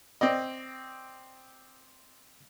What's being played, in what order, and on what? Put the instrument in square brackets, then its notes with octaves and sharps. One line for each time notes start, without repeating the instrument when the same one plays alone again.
[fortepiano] C4 D5 D#5